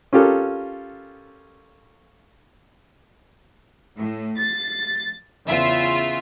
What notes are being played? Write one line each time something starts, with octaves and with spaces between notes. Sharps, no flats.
C#4 F4 G4 A4 A#4
A2
A6
E2 C#3 F4 E5